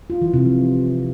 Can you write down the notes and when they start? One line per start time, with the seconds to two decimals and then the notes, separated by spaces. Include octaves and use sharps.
0.10 F4
0.22 E3
0.34 C3
0.46 F3